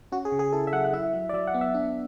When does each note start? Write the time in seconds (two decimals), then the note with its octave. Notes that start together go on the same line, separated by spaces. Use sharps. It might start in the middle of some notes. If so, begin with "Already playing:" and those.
0.12 C#4 F#4
0.25 G#4
0.32 C#3
0.39 G#4
0.53 E4 A4
0.67 E5
0.73 F#3 F#5
0.84 F#5
0.93 E4 E5
1.13 F#3
1.29 D5
1.34 F#3 E5
1.47 F#5
1.54 B3
1.61 E5
1.74 D4